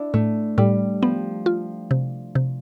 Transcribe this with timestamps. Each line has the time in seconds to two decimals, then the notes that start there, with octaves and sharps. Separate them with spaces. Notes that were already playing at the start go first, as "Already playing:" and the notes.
Already playing: D4 E4
0.13 A2 A3
0.58 A2 G3
1.02 F3 B3
1.46 F4
1.91 C3
2.35 C3